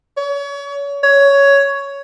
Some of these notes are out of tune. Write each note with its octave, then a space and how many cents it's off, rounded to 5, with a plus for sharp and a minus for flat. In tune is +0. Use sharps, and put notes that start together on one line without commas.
C#5 +35
C#5 +10